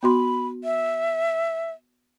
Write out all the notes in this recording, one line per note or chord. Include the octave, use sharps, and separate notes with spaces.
B3 F#4 B5 C6
E5